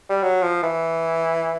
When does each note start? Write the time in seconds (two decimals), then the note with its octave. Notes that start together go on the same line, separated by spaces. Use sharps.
0.09 G3
0.22 F#3
0.42 F3
0.63 E3